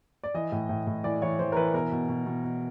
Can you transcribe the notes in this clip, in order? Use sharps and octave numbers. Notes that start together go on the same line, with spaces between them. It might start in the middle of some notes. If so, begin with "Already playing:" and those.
D5
E3 D#5
A2
A2
A2
E3 D5
E3 C#5
E3 C5
A#4
E3 B4
B2 A#4
B2
B2
B2
B2